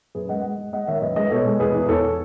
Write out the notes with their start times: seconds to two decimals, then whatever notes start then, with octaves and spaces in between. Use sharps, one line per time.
0.15 F#2 G#4 B4
0.29 G#3 D#5 F#5
0.43 G#3
0.58 G#3
0.73 G#3 D#5 F#5
0.87 D#3 C#5 E5
1.01 F#2 B4 D#5
1.16 G#3 B4 D#5
1.31 B2 A4 C#5
1.46 G#3
1.60 E2 G#4 B4
1.75 E2
1.89 E2 A4 C#5